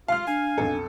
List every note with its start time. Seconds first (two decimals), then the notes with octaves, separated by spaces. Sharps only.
0.08 F4 F5 F6
0.27 D4 G#5
0.58 B1 F2 A4